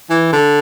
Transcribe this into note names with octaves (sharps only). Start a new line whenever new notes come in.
E3
D3